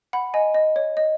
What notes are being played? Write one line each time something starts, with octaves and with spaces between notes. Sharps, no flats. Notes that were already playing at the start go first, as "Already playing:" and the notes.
F#5 B5
D#5 G#5
D#5
C#5
D#5